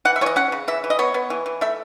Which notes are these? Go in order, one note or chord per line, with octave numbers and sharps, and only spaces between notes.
E3 F#5
E5
E3 C#5 D#5
C#4 F#5
C#3
E3 E5
E3
D#5
B3 C#5
B3
E3
E3
A3 E5